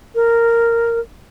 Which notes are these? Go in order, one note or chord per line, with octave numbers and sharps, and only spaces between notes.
A#4